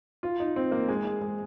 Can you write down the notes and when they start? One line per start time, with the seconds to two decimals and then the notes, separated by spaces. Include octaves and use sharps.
0.23 F4
0.40 D#4
0.56 C4
0.72 A#3
0.88 G#3
1.05 G#3
1.22 G#3